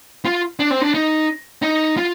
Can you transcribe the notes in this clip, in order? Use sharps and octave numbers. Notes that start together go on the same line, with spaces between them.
F4
D4
C4
D4
D#4
D#4
F4